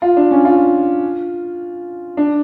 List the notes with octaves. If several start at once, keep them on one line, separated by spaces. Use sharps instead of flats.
F4
D4
C#4
F4
D4